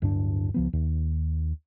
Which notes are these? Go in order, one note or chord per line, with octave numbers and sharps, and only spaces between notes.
D1 G2 D4
C#2 F3 B3
D#2